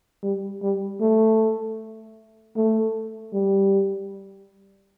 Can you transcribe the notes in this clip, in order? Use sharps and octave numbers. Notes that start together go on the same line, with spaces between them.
G3
G3
A3
A3
G3